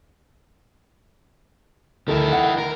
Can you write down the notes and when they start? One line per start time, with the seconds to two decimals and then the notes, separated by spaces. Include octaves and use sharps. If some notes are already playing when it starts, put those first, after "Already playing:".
2.08 D2 D#3 E4 A4 A#4
2.33 F#5
2.58 A#4